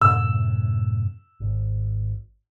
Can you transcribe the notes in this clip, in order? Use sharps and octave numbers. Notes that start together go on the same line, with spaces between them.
F#2 A2 C3 E6
G#1